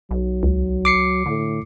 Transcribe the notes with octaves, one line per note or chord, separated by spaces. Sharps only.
B1 F#3
C#2
D6 C7 C#7
A2 D3